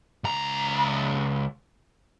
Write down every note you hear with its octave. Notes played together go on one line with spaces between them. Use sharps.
C#2 A#5